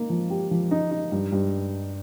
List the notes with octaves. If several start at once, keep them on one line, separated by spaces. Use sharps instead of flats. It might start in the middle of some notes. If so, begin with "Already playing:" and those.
Already playing: A#3 D#4
F3
G4
F3
D#4
D#4
G2
G2